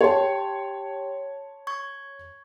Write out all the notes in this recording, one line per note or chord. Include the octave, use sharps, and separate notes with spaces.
G4 C#5 G5 A5 C6
C#6 G#6